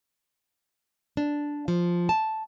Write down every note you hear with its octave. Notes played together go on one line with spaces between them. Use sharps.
D4
F3
A5